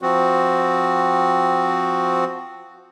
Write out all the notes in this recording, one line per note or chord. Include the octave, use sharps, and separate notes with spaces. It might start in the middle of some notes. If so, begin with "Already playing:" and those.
F3 C4 F#4